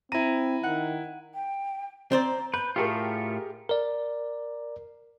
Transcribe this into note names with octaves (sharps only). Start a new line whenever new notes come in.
C4 E4 A#5 D#7
D#3 F#5
G5
C4 C5 D5 A#5
B4 G6
A2 A3 F4 G4 G#4 A#4
A#4 D5